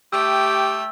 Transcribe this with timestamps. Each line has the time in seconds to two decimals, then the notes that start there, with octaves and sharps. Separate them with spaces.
0.13 A3 G4 G5 E6